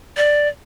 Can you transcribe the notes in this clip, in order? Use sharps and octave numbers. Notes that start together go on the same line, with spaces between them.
D5